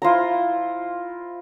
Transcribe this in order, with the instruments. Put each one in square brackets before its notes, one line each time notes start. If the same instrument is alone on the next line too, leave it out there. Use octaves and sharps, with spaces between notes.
[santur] E4 F4 C5 A#5